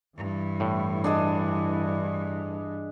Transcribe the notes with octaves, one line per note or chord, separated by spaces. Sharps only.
G2 E3 E4
A2
D4 G#4 D#5